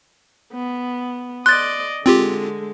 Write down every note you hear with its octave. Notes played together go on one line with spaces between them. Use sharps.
B3
D5 D#5 C6 F#6 A6
D3 G#3 C4 F4 G4